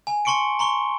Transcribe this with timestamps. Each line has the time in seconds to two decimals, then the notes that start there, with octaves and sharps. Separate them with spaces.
0.07 G#5
0.25 A5 C6 C#6 C#7 D7
0.59 A#5 C6 C#6 G7